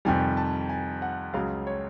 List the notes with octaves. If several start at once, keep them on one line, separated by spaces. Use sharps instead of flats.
F2 C3 D#3 G3 G#5
A5
G#5
F#5
C#2 C#3 F#3 F5
C#5